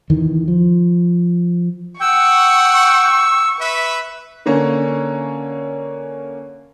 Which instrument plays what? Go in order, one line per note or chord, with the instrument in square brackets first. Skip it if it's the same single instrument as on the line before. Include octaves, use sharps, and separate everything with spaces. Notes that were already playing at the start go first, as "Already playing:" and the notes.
[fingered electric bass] E2 D#3 E3
F3
[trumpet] F#5 [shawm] G5 [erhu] C#6 [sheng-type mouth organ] E6
[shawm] B4 [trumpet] E5
[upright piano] D3 A#3 C#4